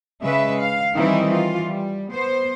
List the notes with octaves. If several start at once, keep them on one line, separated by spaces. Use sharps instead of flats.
C#3 G#3 B4 E5
F5
D#3 E3 G3 C4 D#4 E4
E3 F4
G3
B3 C5